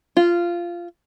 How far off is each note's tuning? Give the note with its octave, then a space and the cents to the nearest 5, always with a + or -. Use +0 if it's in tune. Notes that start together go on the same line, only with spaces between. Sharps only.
F4 -15